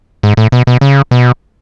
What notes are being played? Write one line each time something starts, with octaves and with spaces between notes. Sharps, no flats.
G#2
A2
B2
B2
C#3
B2